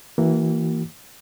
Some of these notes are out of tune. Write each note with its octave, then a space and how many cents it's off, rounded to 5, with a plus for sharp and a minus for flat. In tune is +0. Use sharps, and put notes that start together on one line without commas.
E3 -10 A#3 -20 F#4 +30